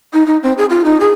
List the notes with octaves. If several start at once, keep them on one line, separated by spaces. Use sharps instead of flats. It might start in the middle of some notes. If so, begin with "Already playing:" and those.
D#4
D#4
C4
G#4
F4
D#4
G#4